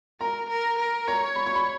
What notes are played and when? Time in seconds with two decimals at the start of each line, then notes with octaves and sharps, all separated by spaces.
0.21 A#4 A#5
0.49 A#4
0.79 A#4
1.08 C#5 A#5
1.36 B5
1.46 C#6
1.55 B5